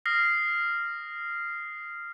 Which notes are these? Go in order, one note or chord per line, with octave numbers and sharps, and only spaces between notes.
D#6 F6 A#6 C7